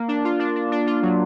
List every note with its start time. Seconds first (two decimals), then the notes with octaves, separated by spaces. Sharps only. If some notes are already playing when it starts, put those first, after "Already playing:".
Already playing: A#3
0.08 D4
0.24 F4
0.39 D4
0.56 D4
0.72 D4
0.87 F4
1.02 F#3